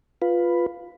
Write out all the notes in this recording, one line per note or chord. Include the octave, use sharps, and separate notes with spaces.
F4 B4